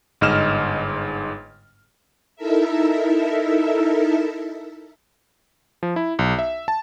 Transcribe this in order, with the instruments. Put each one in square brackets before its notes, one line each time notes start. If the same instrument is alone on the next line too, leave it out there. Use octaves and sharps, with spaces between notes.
[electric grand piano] G1 G#2 D#5 F6 E7
[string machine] D#4 E4 A4 A#4 E5
[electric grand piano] F3
E4
B1
E5
A5